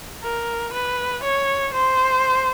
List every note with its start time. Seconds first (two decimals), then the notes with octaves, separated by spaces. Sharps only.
0.23 A#4
0.73 B4
1.23 C#5
1.74 C5